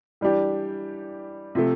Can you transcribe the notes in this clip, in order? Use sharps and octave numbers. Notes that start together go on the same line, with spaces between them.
E3 G3 D4 G4
C3 F3 A3